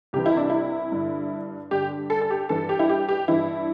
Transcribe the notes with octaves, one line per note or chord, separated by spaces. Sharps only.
C2 C3 E3 G4
E4
D4
E4
G2 D3
G2 D3 G4
A4
A4
G4
G2 E3 A4
G4
E4
G4
G4
G2 E3 E4